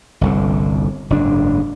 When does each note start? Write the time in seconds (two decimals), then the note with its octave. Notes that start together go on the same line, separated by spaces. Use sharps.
0.21 G1 C2 D3
1.10 F#1 G#2 D4